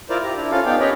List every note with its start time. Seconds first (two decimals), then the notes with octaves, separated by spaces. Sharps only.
0.09 E4 F4 A#4 C5 D5
0.23 G4 A#5
0.37 D4 E4
0.51 C#4 F4 A4 F5
0.65 B3 D4 D#4 G4 F5 G5
0.80 C#4 G4 A#4 C#5 D#5 B5